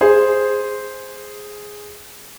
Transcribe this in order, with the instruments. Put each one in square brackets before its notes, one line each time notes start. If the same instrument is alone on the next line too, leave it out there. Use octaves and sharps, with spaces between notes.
[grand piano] G#4 C5